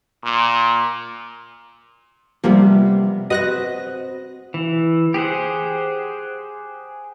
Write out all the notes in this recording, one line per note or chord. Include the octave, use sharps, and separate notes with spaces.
A#2
C3 F3 G3 A#3 B3
C4 F#4 B4 D#5 F#6 A#6
E3
G4 G#4 C5 F#5